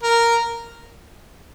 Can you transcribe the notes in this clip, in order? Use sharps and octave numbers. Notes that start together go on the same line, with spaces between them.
A#4